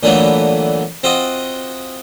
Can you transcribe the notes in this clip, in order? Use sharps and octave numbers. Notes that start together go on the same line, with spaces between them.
A#2 D3 E3 F#3 A3 B3
C4 F4 F#4 D#5